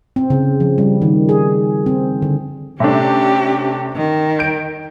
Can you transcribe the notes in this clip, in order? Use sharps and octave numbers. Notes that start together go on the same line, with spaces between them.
C4
C#3
F3
G3
D#3
G#4
C4
D3
C3 A3 C#4 D4 G4
D#3
G6 D7